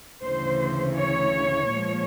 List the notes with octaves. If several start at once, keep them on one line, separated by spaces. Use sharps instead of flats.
D2 C#3 E3 C5
C#5
A#2 F3 G#3